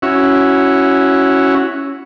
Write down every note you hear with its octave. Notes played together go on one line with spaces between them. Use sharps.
C#4 E4 F#4